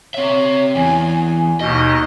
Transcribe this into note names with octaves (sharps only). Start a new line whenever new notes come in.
C4 C#5 E5
E2 G#5
D#2 B2 D#4 D#5